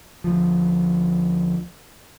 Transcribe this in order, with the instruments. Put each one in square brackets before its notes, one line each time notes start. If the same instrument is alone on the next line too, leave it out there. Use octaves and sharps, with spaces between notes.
[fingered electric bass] D2 F3